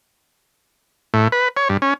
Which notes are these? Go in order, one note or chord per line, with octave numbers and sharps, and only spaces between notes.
A2
B4
C#5
G2
C#4